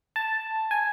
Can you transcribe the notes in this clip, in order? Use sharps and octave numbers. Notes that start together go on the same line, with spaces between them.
A5
G#5